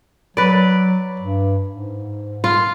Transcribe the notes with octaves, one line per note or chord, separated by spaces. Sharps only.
F#3 B4 D5
G2
G#2
F4